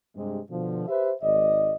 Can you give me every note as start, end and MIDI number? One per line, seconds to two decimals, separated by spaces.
0.16 0.39 43
0.16 0.39 48
0.16 0.39 56
0.50 0.86 47
0.50 0.86 50
0.50 0.86 53
0.88 1.11 67
0.88 1.11 71
0.88 1.11 72
0.88 1.11 76
1.21 1.75 32
1.21 1.75 44
1.21 1.75 74
1.21 1.75 75